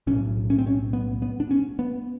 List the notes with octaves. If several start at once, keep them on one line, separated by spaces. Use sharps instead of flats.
B1 A2 C#4
C#4
C4
C#4
B3
B3
D4
C#4
B3